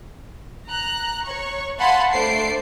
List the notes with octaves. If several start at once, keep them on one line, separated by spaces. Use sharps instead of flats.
A#5 F#6
C#5 C#6
F5 F#5 G#5 A5 B5 C6
A3 D4 C5 C7 D7